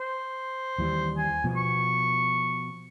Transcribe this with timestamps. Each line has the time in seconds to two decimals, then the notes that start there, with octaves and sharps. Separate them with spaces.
0.01 C5
0.78 D#2 E3 G3
1.17 G#5
1.44 B2 F3 B3
1.57 C#6